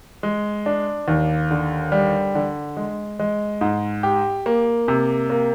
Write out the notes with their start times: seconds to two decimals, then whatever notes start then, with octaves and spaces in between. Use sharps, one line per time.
0.23 G#3
0.66 D4
1.08 D#2
1.51 D3
1.92 G3
2.35 D3
2.77 G#3
3.20 G#3
3.61 G#2
4.03 G4
4.46 A#3
4.88 C3
5.30 A#3